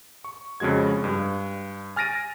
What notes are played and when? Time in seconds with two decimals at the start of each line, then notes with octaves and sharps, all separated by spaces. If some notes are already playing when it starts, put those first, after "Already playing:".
0.24 C#6
0.60 F2 C#3 G#3 F#4 G#6
1.04 G2
1.96 G#5 F6 A6 A#6 D7 D#7